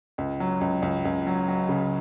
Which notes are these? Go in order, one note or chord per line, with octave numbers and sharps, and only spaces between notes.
C#2
F#3
C#2
C#2
C#2
F#3
F#3
C#3